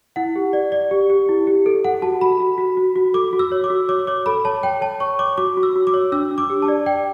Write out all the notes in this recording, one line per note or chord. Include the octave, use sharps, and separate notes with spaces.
E4 F#5
G4
D5
D5
G4
G4
E4
G4
A4
A4 F#5
F#4 A5
F#4 B5
F#4
F#4
F#4
F#4
A4 D6
F#4
E6
C#5
D6
F#4
C#5 D6
C#5 D6
A4 B5
C#5 A5
C#5 G5
C#5 A5
C#5 C#6
C#5 D6
F#4 D6
F#4
E6
F#4
D6
C#5
D4 E6
D4
D6
G4
A5
D5
D5 G5